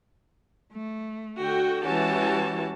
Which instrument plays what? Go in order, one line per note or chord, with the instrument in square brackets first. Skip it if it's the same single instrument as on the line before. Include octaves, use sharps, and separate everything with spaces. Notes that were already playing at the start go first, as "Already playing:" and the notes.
[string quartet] A3
[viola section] D3 F#4 G5
[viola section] E3 G4 A5 [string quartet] G#3 C#4 F#4